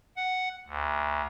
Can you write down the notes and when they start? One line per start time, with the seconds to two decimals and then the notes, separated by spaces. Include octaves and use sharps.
0.16 F#5
0.67 D2